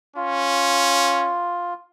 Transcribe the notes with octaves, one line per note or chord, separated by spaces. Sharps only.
C#4 F4